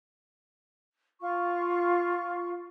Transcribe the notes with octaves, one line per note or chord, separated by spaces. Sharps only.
F4 C#6